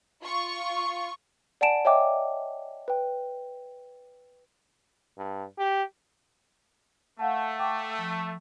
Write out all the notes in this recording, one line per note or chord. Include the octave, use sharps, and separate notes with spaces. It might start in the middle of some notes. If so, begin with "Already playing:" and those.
F4 C#6
D5 F#5 G#5 A5 D7 E7
C#5 D#5 E5 G5 D6
B4 G5
G2
G4
A3 F5 F#5 A5
G5 C#6 D6
F3